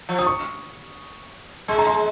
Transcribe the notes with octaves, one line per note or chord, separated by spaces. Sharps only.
F3
D#6
C#6
G#3 C6
A#5
C6